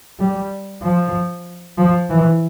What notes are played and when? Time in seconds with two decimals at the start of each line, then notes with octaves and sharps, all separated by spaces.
0.19 G3
0.82 F3
1.77 F3
2.10 E3